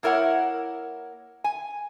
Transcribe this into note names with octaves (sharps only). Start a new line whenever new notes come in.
A#3 E4 A#4 C#5 F#5
G#5